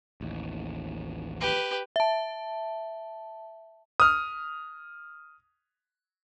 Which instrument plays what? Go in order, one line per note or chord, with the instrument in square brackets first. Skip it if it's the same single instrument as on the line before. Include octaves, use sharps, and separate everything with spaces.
[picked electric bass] A1 D#2
[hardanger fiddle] G4 B4
[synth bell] E5 A5
[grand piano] D#6 F6